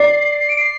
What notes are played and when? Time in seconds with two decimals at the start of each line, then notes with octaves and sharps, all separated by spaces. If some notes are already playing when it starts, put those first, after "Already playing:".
Already playing: D5 C7
0.39 C7
0.49 D7
0.58 C7